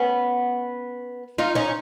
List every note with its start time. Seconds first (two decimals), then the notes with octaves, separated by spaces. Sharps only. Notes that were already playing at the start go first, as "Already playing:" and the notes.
Already playing: B3 C#4
1.38 D#4 F4
1.55 C#4 D#4